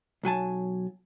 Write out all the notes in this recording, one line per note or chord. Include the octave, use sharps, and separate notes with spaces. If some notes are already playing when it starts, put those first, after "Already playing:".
B1 F#3 G#5 A5